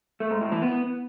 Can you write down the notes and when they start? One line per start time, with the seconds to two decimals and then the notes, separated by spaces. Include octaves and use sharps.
0.20 A3
0.31 G#2
0.41 A2
0.52 E3
0.62 B3